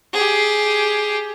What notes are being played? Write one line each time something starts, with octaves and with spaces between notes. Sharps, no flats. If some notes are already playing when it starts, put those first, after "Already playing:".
G4 G#4